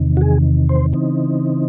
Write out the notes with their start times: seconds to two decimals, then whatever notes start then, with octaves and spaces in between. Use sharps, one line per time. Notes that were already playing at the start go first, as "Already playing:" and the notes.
Already playing: E2 C3 D#3
0.17 F#4
0.21 G#4
0.69 C5
0.93 C#3 E3 C4 D#4